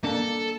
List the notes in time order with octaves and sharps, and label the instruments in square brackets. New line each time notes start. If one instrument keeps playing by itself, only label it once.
[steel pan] A#3 D4 [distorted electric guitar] A4